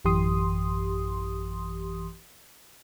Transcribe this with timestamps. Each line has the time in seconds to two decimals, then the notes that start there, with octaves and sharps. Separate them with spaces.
0.05 A1 F#2 E3 G4 C6 D#6